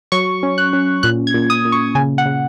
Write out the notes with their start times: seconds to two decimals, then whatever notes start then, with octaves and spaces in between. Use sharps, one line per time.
0.12 F#3 C#6
0.43 C#4
0.58 F#6
0.73 C#4
1.03 A#2 F#6
1.27 G#6
1.34 A#2
1.50 D#6
1.65 A#2
1.72 C#6
1.95 C#3 G#5
2.18 F#5
2.26 C#3